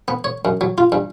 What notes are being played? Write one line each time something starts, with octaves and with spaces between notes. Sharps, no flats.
B3
C#5
F#2
F#3
F4
G2